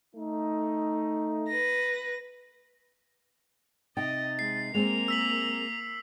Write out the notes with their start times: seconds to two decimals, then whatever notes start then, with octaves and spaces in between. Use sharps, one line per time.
0.16 A3 D#4
1.48 B4 A#6
3.97 C3 D#4 D#5 G5 A6
4.39 G#3 C7
4.74 G#3 A#3 C4 A#4 C5 F7
5.08 E6 B6 F#7